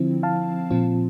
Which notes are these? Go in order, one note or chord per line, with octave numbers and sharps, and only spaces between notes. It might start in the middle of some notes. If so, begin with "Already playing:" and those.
Already playing: D3 F3 C4 E4
F5 A5
A#2 F3 C4 F4